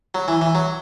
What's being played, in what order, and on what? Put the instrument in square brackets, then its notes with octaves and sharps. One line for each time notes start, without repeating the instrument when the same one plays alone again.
[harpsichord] F#3
E3
E3
F#3